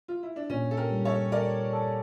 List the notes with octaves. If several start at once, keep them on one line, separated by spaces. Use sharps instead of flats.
F4
E4
D4
A#2 C#4
A4
G4 A#4
G3
A4 C#5
A4 A#4 D5
A4